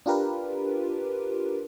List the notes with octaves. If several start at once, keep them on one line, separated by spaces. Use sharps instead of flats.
D4 F4 G4 A#4 B4